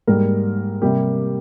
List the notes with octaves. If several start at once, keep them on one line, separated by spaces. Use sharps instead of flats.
G#2 G3 A#3 A#4
C3 G3 A#3 G4